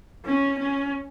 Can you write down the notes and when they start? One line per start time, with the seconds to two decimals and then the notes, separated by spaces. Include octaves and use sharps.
0.26 C#4
0.59 C#4